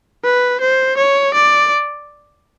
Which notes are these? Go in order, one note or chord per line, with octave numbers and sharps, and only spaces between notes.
B4
C5
C#5
D5